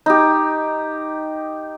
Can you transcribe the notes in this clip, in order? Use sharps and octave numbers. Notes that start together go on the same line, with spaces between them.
D#4 G4